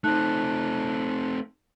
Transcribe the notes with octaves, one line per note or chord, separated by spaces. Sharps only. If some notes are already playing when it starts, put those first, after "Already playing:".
A3 C4 D#4 A5 F#6